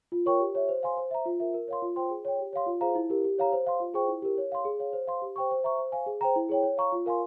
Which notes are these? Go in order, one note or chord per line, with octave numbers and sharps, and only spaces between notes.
F4
A#4 C#5 G5 C#6
G4
C#5 E5
C5
F5 G#5 C6
C5
E5 A#5
F4
A#4 E5
A#4
C#5 F5 C6
F4
C5 G5 C6
G#4
C#5 G5
G4
C#5 F5 C6
F4
G#4 C5 F5 A#5
E4
G4 A#4
G4
C#5 F5 A#5
C5
F5 C6
F4
G#4 C5 G5 C#6
E4
G4 A#4
C#5
F5 C6
G#4
C#5 F5
C5
F5 C6
G4
C5 G5 C#6
C5
E5 A#5 C#6
C5
F5 G#5
G#4
C5 G5 A#5
E4
G#4 C#5 G5
C#5
F5 A#5 C#6
F4
A#4 F5 G#5 C6